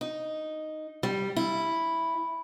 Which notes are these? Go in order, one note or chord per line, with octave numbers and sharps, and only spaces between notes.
D#4
G3
E4